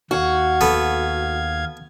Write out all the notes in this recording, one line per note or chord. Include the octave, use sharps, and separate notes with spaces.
D#2 F#4 F5 G#6
B3 A4